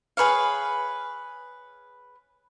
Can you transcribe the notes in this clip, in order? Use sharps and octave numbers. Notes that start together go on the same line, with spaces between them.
G#4 B4 C#5 F5